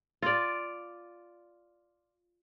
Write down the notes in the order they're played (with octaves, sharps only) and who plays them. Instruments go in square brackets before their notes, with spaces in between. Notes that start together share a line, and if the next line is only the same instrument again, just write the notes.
[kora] F4 D5